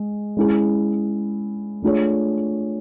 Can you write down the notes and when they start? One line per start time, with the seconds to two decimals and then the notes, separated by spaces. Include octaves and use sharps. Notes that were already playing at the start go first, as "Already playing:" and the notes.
Already playing: G#3
0.37 G#3 C#4 E4 G#4
1.82 A3 D4 F4 G#4 C#5